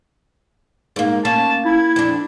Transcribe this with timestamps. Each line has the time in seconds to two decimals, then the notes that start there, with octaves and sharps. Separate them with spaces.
0.96 G#2 A#3
1.25 A#3 C#4 A5
1.65 E4 G#6
1.96 F2 D4